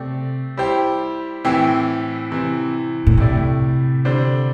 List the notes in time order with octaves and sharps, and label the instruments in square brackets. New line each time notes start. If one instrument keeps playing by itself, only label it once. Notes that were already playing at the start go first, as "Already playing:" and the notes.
Already playing: [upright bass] C3 [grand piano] A3 C4 G4 D5
[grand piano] G3 E4 G4 C5
A2 E3 C4 E4 G4
C3 E3 C4
[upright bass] A2
[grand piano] A2 A3 E4 G4 D5 [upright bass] C3
[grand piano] D3 G3 D4 C5